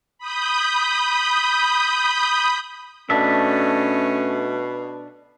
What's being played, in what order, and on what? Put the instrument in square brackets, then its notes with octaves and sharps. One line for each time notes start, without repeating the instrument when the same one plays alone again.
[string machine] B5 D#6 G6
[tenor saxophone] B2 [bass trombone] A3 [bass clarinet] C#4 [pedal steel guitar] D4 E5